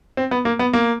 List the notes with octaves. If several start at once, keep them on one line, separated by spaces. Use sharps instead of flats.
C4
B3
A#3
B3
A#3